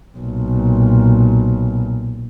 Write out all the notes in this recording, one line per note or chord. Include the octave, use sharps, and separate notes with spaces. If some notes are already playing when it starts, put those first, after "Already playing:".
B1 A#2